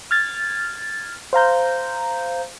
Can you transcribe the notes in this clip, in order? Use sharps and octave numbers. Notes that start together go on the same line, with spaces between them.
F6 G#6 A6
C5 F5 A#5 G6